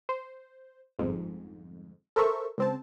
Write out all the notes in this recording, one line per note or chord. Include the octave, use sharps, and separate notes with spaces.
C5
G1 F2 G#2
A4 A#4 C5 E5 C#6
C#2 C4 A5